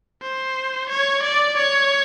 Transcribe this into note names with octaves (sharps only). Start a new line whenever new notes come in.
C5
C#5
D5
C#5